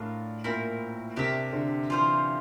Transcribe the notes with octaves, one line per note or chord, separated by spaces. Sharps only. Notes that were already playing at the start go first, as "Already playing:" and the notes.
Already playing: A2 D4 F4 A#4
A#2 C4 E4 A#4
C3 D4 G4 A#4 E5
D3
E3 F4 C5 F5